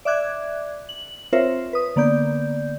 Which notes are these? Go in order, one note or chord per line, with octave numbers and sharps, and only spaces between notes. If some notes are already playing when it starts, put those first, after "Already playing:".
D5 E5 D6 F#6 G#6
F#7
C4 F4 A#4 C5 C#5 E5
B4 D#6
D3 A#3 B3 D5 G6